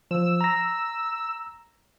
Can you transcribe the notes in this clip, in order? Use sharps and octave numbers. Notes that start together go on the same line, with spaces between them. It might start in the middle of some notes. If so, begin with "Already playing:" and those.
F3 E6
A#5 A#6